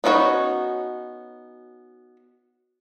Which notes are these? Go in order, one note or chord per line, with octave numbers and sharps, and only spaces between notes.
B3 C#4 D#4 F#4 C#5